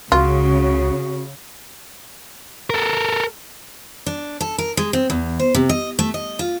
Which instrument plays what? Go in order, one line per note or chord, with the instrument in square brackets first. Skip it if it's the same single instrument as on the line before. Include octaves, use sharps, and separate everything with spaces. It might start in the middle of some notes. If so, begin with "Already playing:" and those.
[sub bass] C#2 [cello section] C#3 [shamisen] F4 [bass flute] F#4
[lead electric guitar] A4 A#4
[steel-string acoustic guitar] D4
A4
A#4
G#3
C4
E2
C5
C3
D#5
A3
D#5
F4